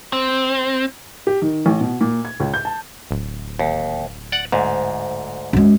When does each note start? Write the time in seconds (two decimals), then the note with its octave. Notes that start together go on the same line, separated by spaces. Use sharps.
0.13 C4
1.27 G4
1.42 D#3
1.66 A1
1.81 B2
2.01 A#2
2.25 G#6
2.40 C#2
2.54 G6
2.65 A5
3.11 D1
3.59 D#2
4.32 D5 F#5
4.52 D2 G#2
5.53 F#2 G#3